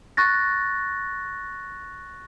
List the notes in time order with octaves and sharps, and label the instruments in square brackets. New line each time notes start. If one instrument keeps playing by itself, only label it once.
[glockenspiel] C#6 F#6 A6 A#6